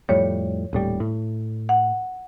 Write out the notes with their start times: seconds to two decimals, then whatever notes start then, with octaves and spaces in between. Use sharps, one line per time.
0.09 F2 A2 G3 C#5
0.73 D#1 A2 G3
1.00 A2
1.69 F#5